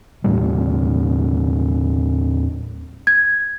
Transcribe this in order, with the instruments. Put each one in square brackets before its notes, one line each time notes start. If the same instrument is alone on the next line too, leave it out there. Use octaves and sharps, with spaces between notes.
[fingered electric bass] D#2 A2 G3
[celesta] G#6